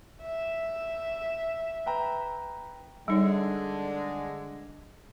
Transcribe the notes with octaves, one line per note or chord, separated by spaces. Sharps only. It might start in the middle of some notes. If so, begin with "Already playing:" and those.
E5
B4 G5 A#5
D3 G3 G#3 D4 D#4 C#5